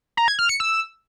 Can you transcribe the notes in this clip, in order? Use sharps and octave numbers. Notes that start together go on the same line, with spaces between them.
A#5
G#6
F6
C#7
E6